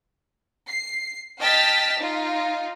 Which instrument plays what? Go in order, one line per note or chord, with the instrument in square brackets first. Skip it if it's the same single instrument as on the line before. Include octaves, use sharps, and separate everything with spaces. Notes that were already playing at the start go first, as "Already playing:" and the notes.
[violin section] C7
D#5 G5 A5 F6 A6 B6
D#4 F4